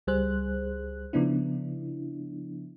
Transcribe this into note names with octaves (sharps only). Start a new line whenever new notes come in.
C#2 G3 G#4 C5 F#6
C#3 F3 B3 D4 E4